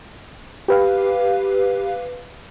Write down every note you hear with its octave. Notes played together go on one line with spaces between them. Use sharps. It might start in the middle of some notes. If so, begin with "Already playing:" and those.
G4 B4 F5